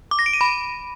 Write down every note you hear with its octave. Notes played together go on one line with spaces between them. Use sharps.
D6
A#6
D7
D#7
B5